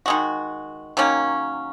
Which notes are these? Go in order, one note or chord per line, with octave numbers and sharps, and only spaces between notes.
D#3 G#3 F#4
D#3 F#3 A#3 C#4